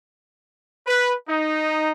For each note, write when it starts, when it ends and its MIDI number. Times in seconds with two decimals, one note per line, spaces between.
0.87 1.13 71
1.29 1.91 63